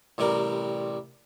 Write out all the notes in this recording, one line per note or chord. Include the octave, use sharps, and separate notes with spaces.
A1 C3 G3 A#4 C6